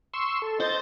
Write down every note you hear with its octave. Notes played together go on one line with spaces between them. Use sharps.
C6 C#6 E6
A4
C5 D#5 G6 A6